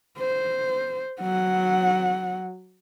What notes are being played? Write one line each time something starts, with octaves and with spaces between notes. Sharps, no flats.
C5
F#3 F#5